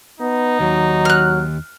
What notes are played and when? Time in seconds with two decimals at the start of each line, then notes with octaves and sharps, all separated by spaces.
0.20 B3 D#4
0.60 D#2 F#3
1.05 F6 F#6